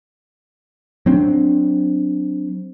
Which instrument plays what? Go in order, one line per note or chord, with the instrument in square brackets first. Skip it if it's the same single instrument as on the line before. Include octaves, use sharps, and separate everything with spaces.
[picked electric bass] F#3 C4 D4